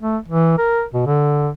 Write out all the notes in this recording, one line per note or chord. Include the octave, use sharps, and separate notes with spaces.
A3
E3
A#4
B2
D3